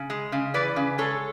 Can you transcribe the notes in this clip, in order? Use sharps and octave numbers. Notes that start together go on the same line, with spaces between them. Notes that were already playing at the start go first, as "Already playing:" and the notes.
Already playing: C#3
G#3
C#3
E3 B4 D5
C#3
G#3 A4 C#5